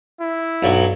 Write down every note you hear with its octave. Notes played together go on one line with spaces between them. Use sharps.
E4
B1 G2 F#3